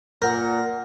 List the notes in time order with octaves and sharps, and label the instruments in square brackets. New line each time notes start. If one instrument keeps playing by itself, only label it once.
[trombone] A#2 [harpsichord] A#4 [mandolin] F#5 E6 G6